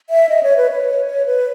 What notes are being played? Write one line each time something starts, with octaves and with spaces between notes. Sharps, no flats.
E5
D#5
C#5
B4
C#5
C#5
B4